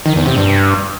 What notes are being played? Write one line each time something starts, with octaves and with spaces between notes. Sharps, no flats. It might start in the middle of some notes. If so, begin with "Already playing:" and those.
D#3
E2
C3
G2